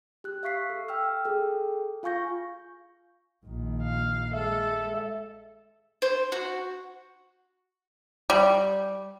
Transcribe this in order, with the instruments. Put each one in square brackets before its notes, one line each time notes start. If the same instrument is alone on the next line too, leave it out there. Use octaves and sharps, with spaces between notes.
[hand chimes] G4 F#6
E5 F5 C#6 B6 C7
A4
G5 E6 F6
G#4 A4 G5
F4 F5 G#5 C#6 G6 A#6
[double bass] A#1 D#3
[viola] F5
[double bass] G#3 [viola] A4 [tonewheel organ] E5
[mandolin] C5
F#4
[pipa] G3